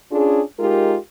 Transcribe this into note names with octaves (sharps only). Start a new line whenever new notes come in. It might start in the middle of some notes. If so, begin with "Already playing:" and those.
C#4 D4 F4 G#4
G#3 D#4 F4 G4 A#4